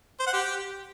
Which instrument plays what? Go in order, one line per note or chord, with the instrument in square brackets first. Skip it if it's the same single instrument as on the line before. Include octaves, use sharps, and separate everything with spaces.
[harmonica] C5
F#5
G4